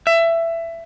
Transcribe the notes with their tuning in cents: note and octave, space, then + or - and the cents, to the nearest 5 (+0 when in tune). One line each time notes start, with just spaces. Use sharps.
E5 +20